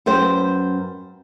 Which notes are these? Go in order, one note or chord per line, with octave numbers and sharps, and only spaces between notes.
F#2 B4 C5 G5